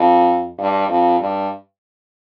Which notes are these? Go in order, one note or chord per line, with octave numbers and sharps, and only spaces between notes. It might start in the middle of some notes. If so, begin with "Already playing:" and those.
Already playing: F2
G2
F2
G2